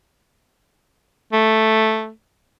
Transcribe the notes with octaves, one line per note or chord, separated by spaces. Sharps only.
A3